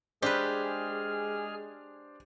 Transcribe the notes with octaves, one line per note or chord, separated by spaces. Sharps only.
G#3 D4 G4 G#4 B4 C5 F6